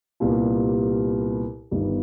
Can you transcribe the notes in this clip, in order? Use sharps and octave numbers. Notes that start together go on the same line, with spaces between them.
C2 A#2 G3 B3
G1 G2 D#3 G3 B3